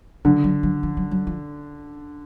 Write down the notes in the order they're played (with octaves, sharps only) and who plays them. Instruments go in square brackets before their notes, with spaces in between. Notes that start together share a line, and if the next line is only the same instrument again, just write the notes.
[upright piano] D3 [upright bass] F#3
[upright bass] F#3
F#3
F3
F#3
F#3
F3